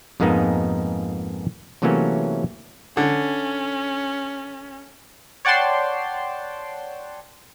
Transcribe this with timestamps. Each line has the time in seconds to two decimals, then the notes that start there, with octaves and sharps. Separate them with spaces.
0.20 F2 G#2 G#3 A#3 B3 D#4
1.82 C3 E3 F#3 A3 A#3 C#4
2.97 D3 C#4
5.45 C#5 D5 F#5 G5 A5 C6